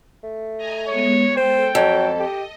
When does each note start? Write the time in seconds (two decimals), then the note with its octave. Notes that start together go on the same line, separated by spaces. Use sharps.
0.24 A3
0.57 D#5 G#5 A#5
0.88 G#3 B3 C#5
1.37 A4 C5 G5
1.75 F2 F#3
2.20 G4 D#5